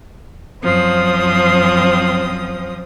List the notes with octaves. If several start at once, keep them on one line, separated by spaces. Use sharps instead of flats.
F#2 F3 C4 D#6